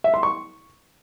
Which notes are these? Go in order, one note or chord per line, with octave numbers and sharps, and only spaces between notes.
E5
C6
C#6